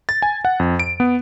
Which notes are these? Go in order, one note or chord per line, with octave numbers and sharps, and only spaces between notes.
A6
G#5
F#5
F2
D7
B3